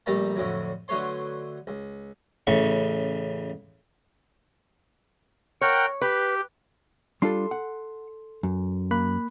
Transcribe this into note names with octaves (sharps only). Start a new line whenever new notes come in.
A#1 G3 A3 A#4 A5 B5
F2 A2 D3 F#3
D3 F#3 A3 B4 C#5 C6
C#2
A1 A2 C#3 C#6
A#4 C#5 F#5 G5
G4 B4
G3 D4 F4 A4 C6
F#5
F#2
A#3 B5 F#6